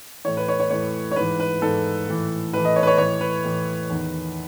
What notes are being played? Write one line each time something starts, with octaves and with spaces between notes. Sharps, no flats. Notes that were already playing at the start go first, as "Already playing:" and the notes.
A2 E3 C#5
B4
C#5
C#5
A2 E3 C#5
C#5
G#2 E3 B4
B4
G#2 E3 A4
A2 E3
A2 E3 B4
D#5
C#5
B4
C#5
A2 E3 C#5
B4
A2 E3
E2 D#3